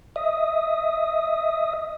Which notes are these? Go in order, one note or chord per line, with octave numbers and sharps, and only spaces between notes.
D#5 E5 D#6